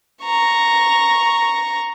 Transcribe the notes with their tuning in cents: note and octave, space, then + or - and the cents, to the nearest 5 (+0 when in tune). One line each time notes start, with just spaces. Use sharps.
A#5 +0 C#6 +0